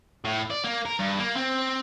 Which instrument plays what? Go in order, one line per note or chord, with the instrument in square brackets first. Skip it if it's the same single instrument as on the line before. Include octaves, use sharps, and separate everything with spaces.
[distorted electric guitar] A2
D5
A#3
A#4
G2
A#3
C4